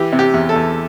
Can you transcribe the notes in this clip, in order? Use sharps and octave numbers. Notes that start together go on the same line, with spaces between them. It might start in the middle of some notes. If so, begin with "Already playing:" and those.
Already playing: E3 G4
C3
G4
E2
A4
E2